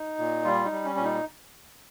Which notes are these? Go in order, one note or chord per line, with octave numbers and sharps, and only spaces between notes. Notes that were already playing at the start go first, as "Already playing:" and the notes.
Already playing: D#4
A#2
G3 F4
D#4
G3
C#4
A#2 C#4
D#4